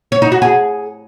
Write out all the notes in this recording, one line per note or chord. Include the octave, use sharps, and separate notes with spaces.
C#5
D#4
F#4
G#4